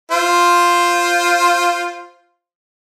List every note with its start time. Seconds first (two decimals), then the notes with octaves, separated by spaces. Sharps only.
0.12 F4 C5